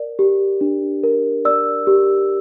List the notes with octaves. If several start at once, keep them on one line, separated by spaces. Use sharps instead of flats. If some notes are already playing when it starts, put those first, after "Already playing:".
Already playing: A#4 D5
G4
D4
A#4
D5 E6
G4